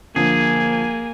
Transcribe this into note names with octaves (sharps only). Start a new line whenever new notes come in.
D3 F3 A#3 G#4 G#5